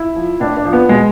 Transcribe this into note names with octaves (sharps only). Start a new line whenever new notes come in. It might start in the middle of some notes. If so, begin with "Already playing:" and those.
Already playing: E4
F3
A2 D4
D4
F3
B3
B2 G#3